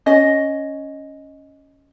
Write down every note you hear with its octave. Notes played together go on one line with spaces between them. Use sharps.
C#4 D#5